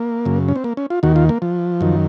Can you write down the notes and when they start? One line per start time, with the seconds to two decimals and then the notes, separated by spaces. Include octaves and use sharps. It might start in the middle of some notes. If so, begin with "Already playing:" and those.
Already playing: A#3
0.25 F#2 C#3
0.48 C#4
0.56 C4
0.64 A#3
0.77 C#4
0.90 F4
1.03 D#2 D#3 F#4
1.16 F4
1.29 A#3
1.42 F3
1.81 F#2 D#3